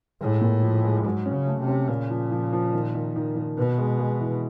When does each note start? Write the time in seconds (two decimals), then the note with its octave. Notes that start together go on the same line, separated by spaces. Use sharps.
0.21 A2 G#3
0.41 A#2
0.63 F3
0.84 G#3
1.04 G#2 F#3
1.26 C#4
1.33 C#3
1.47 A3
1.61 C3
1.68 C#4
1.89 A#2 C#3
2.10 F3
2.32 F3
2.53 F3
2.73 D#3
2.95 D#3
3.16 D#3
3.36 D#3
3.58 B2 B3
3.78 G#3
4.00 G#3
4.20 E3